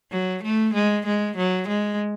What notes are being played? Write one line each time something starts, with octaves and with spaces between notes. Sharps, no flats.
F#3
A3
G#3
G#3
F#3
G#3